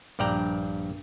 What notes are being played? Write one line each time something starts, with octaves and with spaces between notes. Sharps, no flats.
A#1 G2 D5 G5 A#5